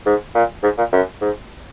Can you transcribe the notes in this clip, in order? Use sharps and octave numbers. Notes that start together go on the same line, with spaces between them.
G#2
A#2
G#2
A#2
F#2
G#2